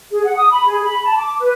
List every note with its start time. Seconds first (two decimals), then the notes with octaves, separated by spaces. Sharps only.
0.10 G#4
0.23 F#5
0.36 D#6
0.50 B5
0.66 G#4
0.82 B5
1.03 A5
1.16 D6
1.40 B4